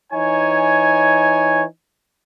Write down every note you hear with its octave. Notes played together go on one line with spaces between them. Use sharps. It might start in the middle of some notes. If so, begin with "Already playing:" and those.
E3 D#4 C#5 G#5